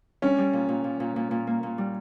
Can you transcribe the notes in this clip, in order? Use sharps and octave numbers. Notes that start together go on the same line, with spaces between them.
G3 C#4
G3
A#2
A#2
A#2
A#2
A#2
A#2
A#3
A#2
G3